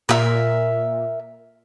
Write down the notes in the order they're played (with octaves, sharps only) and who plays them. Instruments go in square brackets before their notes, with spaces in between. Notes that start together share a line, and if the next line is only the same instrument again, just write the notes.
[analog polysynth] A#2 [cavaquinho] A#4 E5